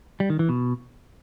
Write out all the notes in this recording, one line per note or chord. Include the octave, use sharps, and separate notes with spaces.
G3
D#3
E3
B2